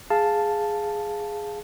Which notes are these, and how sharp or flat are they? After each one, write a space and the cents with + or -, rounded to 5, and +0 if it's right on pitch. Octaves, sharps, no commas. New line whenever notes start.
G#4 +0 F5 +0 A5 +0